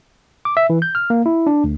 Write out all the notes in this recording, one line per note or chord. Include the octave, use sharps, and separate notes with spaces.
D6
E5
E3
G6
F6
A#3
E4
D4
D2